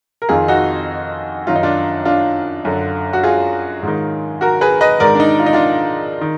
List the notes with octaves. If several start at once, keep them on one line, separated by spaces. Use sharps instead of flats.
A#4
F2 D#3 F4 G#4
D#4 F#4
F#2 D#3 F4
D#4
D4 F4
D4 F4
F#2 D3
F#4
F4 G#4
G#2 D#3
F#4 A#4
G#4 B4
B4 D#5
G#2 D#3 A#4 D5
D4
D#4
F4
D#4
D4 F4
D#3